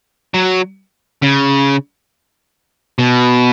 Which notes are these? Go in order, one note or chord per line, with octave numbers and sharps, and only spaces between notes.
F#3
C#3
B2